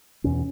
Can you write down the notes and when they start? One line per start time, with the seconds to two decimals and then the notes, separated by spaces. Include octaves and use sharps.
0.24 E2 B2 C#4